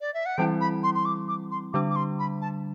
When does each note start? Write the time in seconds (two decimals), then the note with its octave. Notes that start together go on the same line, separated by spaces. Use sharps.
0.01 D5
0.14 E5
0.26 F#5
0.37 E3 G3 C4 E4 G5
0.61 B5
0.83 C6
0.95 C6
1.05 D6
1.28 D6
1.51 C6
1.73 D3 G3 D4 D6
1.89 D6
1.96 C6
2.19 B5
2.41 A5